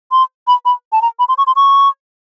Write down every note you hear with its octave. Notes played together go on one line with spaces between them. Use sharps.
C6
B5
B5
A5
A#5
B5
C6
C#6
C6
C#6